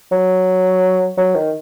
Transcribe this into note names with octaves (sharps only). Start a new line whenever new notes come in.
F#3
F#3
D#3